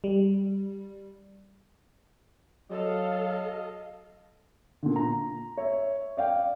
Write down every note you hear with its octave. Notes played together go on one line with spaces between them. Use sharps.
G3
F#3 A4 D#5 F5
A#2 D3
A#5
C#5 E5
D5 F5 G5